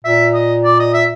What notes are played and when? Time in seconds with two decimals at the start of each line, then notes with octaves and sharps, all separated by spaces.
0.05 A#2 E5
0.34 D#5
0.64 D5
0.79 D#5
0.93 E5